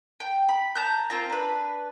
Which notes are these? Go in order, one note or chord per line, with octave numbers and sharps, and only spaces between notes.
G5
B5
A5 A#5 G6
A#3 C4 F4 A#5
D4 B4